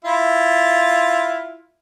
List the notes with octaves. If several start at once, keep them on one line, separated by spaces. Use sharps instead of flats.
E4 F4